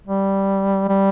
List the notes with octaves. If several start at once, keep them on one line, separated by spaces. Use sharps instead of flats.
G3
G3